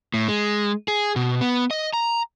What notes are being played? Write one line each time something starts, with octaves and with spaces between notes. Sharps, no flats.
A2
G#3
G#4
B2
B3
D#5
A#5